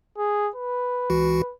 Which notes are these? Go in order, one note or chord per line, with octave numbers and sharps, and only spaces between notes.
G#4
B4
C#2 E3 F#4